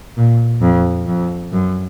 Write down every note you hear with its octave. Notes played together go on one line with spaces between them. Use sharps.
A#2
F2
F2
F#2